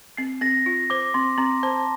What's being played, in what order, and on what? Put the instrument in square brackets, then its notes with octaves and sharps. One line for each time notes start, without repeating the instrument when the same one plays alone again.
[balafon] C4 [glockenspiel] C7
[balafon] C4 [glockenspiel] A#6
[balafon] F4
[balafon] C5 [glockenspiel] D6
[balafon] C4 [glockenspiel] C6
[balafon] C4 [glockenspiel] A#5
[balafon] C5 [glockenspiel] A5